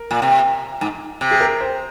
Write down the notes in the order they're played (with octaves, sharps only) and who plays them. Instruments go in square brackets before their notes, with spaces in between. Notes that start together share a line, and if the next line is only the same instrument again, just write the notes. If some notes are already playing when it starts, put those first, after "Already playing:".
Already playing: [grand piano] A#4
[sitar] A#2
C3
G#2
C3
[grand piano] G#4
A#4
C5